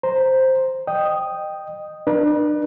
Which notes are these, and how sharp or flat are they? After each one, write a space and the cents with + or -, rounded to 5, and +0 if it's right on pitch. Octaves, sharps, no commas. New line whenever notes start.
C5 +0 A#5 +0
D#5 -25 G5 +0 D#6 +0
D4 +35 B4 -45